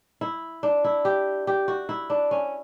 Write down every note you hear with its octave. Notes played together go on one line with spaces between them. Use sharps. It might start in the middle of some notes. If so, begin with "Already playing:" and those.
E4
D4
E4
G4
G4
F#4
E4
D4
C#4